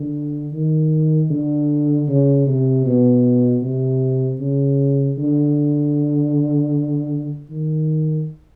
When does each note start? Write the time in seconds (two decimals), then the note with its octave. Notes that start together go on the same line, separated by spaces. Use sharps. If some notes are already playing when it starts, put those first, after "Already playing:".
Already playing: D3
0.53 D#3
1.30 D3
2.08 C#3
2.47 C3
2.85 B2
3.62 C3
4.40 C#3
5.18 D3
7.50 D#3